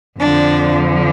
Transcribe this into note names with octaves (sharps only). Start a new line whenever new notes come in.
F2 D3 F3 D4